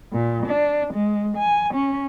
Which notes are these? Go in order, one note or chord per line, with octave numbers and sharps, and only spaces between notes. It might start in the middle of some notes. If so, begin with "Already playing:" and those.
A#2
D4
G#3
G#5
C#4